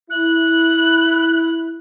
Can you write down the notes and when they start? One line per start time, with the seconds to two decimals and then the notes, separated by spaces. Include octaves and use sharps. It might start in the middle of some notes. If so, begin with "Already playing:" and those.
0.10 E4 F#6